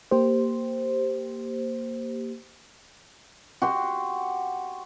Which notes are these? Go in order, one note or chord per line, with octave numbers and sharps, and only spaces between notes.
A#3 G4 C5
F#4 G4 C6